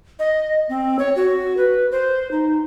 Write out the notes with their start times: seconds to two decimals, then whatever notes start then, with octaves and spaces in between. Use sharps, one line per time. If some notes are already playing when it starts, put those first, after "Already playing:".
0.19 D#5
0.69 C4
0.99 C#5
1.16 F#4
1.57 B4
1.92 C5
2.31 D#4